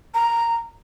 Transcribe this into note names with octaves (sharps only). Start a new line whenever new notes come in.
A#5